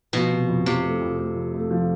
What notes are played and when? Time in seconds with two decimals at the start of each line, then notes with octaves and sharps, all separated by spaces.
0.13 B2 F3
0.31 C3
0.48 F2
0.65 C3 F3
0.83 A3
1.01 F2
1.19 A3
1.36 F2
1.54 A3
1.71 F3